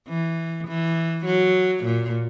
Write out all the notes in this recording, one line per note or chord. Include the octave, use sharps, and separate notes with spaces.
E3
E3
F#3
A#2